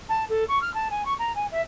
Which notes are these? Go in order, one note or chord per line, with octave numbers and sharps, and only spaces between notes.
A5
A4
C#6
F6
A5
G#5
C#6
A#5
G#5
E5